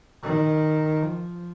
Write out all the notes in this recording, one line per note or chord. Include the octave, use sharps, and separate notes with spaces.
D#3
F3